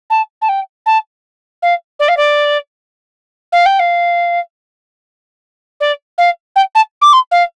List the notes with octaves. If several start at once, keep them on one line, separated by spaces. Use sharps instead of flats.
A5
A5
G5
A5
F5
D5
F5
D5
F5
G5
F5
D5
F5
G5
A5
D6
C6
F5